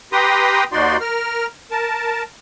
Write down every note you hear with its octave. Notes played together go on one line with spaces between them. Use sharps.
G4 B4 G5 A#5 C6 D#6
D#2 D#4 F#4 D5 C6
A#4 F6
A#4 A5